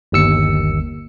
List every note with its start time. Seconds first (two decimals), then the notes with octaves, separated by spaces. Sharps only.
0.12 G1 D#2 E6 C#7